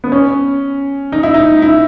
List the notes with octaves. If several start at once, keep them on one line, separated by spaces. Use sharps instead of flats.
B3
C#4
D#4
E4
D#4
E4